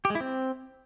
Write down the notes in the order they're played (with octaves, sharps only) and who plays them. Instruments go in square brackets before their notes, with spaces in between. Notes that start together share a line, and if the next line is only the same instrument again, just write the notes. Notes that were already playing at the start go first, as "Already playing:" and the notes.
[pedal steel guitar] G4
G#3
E4
C4